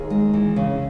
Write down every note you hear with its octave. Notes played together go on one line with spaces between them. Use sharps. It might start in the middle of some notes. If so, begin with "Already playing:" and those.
Already playing: D#2 G#4
G#3
E3
C#3